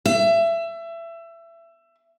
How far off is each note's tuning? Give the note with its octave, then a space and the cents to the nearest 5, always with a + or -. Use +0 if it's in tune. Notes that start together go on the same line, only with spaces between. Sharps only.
E5 +25